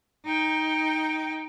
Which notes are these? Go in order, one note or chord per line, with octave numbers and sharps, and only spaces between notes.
D#4 G5